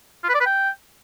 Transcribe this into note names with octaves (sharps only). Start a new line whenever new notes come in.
F4
B4
D5
B4
G5